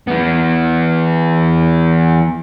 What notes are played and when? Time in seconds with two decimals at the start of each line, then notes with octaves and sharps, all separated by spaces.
0.07 E3 B3